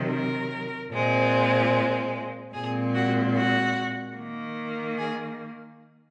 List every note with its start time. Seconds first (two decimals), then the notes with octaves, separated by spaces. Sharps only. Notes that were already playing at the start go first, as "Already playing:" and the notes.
Already playing: C3 D#3 F#3
0.10 A#4
0.92 A#2 G#3 C4
2.54 A#2 G#3 C4 G#4
2.95 F#4
3.35 F#4
4.17 D#3 A#3
4.98 G#4